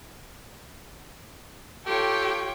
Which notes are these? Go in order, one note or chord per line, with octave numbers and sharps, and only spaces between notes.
F4 G4 A4 C#5 G5 C#6